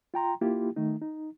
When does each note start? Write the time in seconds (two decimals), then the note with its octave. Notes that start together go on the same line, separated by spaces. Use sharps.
0.14 F4 G5 A#5 C6
0.41 A#3 E4 F4 G4
0.76 D#3 A3 D#4
1.01 D#4